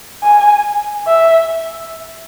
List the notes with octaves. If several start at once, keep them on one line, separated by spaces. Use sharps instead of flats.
G#5
E5